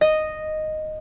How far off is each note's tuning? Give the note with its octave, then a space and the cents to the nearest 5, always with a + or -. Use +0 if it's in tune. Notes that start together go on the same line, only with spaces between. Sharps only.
D#5 -5